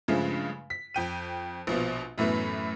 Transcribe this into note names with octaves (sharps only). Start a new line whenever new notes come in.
G2 C#3 F3 G#3 A3
B6
F2 G5 D#7
A#1 B2 F3
F#2 A2 E3 A3 B3